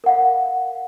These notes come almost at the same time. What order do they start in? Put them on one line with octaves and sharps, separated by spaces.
A#4 F#5 F5